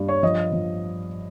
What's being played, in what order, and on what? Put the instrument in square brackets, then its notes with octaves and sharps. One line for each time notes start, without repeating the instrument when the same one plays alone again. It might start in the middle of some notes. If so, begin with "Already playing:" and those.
Already playing: [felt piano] G2
C#5
F3 D#5
F3